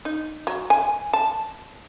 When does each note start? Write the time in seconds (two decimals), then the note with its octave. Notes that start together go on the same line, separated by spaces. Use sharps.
0.05 D#4
0.47 F#3
0.70 G#5
1.13 A5